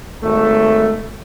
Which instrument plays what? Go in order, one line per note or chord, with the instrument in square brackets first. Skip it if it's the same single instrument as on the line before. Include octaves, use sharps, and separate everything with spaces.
[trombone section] G#1 A3